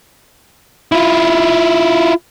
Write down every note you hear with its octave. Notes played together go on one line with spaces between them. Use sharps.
E4 F4